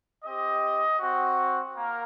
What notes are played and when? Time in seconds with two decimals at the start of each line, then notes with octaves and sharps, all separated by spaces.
0.24 C4 G4 D#5
1.00 C4 F#4
1.75 A#3 A#4